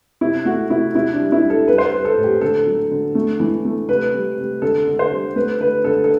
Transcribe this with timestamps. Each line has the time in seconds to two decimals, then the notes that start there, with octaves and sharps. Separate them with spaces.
0.21 C3 E4
0.45 A3 F#4
0.70 C3 E4
0.94 C3 E4
1.13 D4
1.19 G3
1.32 E4
1.44 G3
1.50 A4
1.68 G3 B4
1.78 C5
1.87 B4
1.93 G3
2.05 A4
2.17 A2
2.24 G4
2.41 D3 A4
2.67 F#3
2.91 D3
3.15 A3
3.40 E3
3.65 A3
3.88 C3 B4
4.14 G3
4.37 C3
4.62 D3 A4
4.87 D3
4.99 C5
5.12 G3
5.35 A3 B4
5.60 D3 B4
5.84 D3 A4
6.04 A4